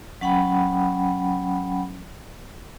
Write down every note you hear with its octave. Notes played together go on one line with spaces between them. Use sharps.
F#3 C#4 F#5 G5 B5